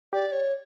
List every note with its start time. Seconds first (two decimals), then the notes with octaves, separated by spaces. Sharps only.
0.13 G4 D5
0.32 C#5